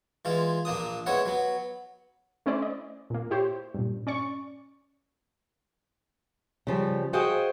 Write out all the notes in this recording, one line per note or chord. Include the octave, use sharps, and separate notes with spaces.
E3 G#3 F4
A#1 A#3 D4 D#6
G#3 B3 E4 C#5 F#5
F#3 B3
A3 C#4 E4 C5 D5
D#5
A#2 A#3
E4 G4 C5 C#5
G2 A#2
C#4 D5 C#6
C#3 F3 G3
F#4 G#4 C5 D#5 F5 G5